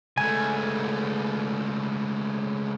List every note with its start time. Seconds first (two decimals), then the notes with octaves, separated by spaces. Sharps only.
0.18 C#2 A3 G#5